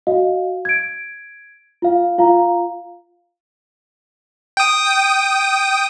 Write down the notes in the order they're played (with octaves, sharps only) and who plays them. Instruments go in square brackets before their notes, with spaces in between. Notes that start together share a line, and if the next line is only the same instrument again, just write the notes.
[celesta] F#4 D#5 F5
G#6 D7
F4 F5
F4 F5 A#5
[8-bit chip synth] G5 D#6